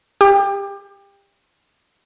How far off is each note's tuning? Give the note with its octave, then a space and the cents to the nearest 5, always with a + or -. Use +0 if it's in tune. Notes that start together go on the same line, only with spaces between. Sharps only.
G4 +25